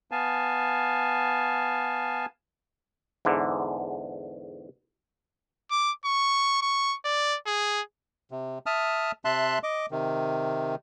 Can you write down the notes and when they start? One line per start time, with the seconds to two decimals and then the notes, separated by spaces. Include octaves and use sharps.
0.11 B3 F5 G#5 A5
3.25 E2 G#2 D3
5.70 D6
6.05 C#6
6.62 C#6
7.05 D5
7.47 G#4
8.31 C3
8.66 E5 A5 D#6 F6
9.25 C3 E5 A5 C6 F#6
9.63 D#5 D6
9.91 C3 D#3